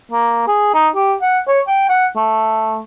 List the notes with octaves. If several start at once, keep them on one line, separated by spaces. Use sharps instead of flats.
A#3
G#4
D#4
G4
F#5
C#5
G5
F#5
A3